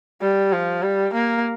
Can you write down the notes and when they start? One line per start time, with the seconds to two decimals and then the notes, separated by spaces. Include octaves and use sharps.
0.21 G3
0.53 F3
0.83 G3
1.14 A#3